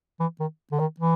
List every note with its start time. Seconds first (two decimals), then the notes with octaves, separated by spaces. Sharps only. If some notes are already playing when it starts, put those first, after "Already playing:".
0.20 E3
0.40 D#3
0.72 D3
0.80 D#3
1.00 E3